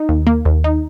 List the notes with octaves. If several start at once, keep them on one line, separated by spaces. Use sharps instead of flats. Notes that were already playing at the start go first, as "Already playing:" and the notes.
Already playing: D#4
D#2
A#3
D#2
D#4